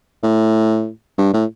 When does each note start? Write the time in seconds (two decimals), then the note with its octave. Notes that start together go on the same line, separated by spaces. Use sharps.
0.23 A2
1.18 G2
1.33 A2